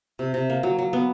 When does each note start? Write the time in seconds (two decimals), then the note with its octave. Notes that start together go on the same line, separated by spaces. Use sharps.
0.19 C3
0.34 C3
0.50 A#3
0.63 F#3
0.79 F#3
0.93 B3